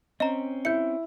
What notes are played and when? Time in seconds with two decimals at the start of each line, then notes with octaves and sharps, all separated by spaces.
0.20 C4 C#4 D#5 A#5
0.65 E4 G6 C#7